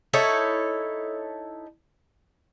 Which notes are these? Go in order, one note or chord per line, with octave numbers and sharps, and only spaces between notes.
D#4 E4 A4 C#5